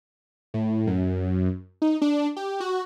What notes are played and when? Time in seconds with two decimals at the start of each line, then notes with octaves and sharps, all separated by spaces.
0.54 A2
0.87 F#2
1.82 D#4
2.02 D4
2.36 G4
2.60 F#4